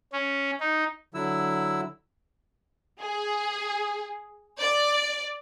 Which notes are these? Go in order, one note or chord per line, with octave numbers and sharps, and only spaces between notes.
C#4
D#4
D3 F#3 E4 E6
G#4
D5